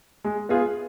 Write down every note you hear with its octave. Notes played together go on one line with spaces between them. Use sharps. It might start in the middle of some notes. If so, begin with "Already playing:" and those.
G#3
B3 F4 G#4